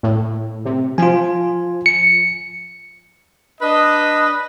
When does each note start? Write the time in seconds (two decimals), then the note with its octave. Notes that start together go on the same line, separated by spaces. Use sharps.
0.03 A2
0.65 C3
0.98 F3 F4 G#5
1.86 C#7
3.60 D4 B4 D#5